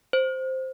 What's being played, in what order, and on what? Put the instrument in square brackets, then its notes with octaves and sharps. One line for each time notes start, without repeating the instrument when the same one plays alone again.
[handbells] C5